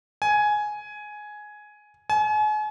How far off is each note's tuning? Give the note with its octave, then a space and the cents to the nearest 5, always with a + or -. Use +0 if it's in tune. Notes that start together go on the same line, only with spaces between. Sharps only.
G#5 +10
G#5 +40